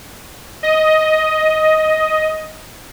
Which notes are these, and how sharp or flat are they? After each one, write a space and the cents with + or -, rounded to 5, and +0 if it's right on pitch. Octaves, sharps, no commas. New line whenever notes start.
D#5 +10